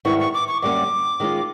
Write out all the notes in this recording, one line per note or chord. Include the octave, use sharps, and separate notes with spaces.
G#2 D#3 G3 B3 E4 C#6
C#6
D6
C#6
F#2 D3 G3 A#3 C#4 D6
D#3 G#3 C#4 F4